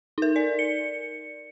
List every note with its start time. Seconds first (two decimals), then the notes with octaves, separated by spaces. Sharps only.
0.18 D#4 A#4
0.36 D5
0.59 C#7